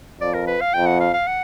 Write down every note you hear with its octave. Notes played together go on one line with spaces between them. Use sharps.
F2 D5
A#4
B4
F5
F2 G5
F#5
F5
F5
F#5